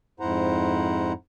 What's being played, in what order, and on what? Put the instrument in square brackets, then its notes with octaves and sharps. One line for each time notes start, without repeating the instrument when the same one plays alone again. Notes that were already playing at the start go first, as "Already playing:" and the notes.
[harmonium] F2 G#2 E4 C5 F#5 A#5